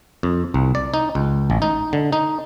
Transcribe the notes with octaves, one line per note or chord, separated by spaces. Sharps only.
F2
C2
D5
D#4
C#2
A1
D#4
D3
D#4